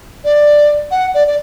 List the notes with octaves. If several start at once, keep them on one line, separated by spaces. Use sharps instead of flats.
D5
F#5
D5
D5